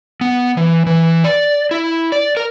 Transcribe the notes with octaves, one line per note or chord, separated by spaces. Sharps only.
B3
E3
E3
D5
E4
D5
A#4